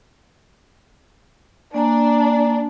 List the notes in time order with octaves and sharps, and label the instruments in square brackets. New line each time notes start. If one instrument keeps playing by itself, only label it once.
[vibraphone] A#3 G#5 A#5 [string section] D4